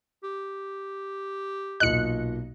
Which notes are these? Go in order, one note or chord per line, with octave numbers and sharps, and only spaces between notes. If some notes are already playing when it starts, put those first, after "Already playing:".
G4
B1 A#2 D#5 F#6 C#7